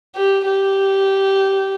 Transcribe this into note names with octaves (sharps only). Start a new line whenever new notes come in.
G4
G4